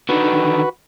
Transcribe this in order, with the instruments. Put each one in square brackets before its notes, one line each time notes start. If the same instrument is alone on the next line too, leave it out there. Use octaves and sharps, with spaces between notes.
[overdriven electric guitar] D3 D#3 [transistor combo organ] F#4 B4